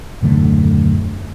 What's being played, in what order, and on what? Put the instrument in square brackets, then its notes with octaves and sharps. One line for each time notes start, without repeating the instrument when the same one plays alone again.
[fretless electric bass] D#1 F#2 D3 A3